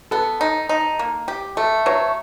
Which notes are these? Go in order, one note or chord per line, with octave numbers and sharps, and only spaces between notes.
B3 A4
D#4
D#4
A#3
G4
A3 A4
F#3 C#5